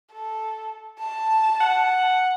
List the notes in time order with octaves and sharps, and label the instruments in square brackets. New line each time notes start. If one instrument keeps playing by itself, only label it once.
[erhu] A4
A5
[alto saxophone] F#5